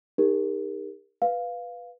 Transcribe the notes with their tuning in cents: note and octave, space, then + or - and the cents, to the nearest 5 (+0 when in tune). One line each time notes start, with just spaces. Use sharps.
D#4 -5 G4 +40 A#4 +0
B4 +0 F5 +0